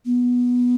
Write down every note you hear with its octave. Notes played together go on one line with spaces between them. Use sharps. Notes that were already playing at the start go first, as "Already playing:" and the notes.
B3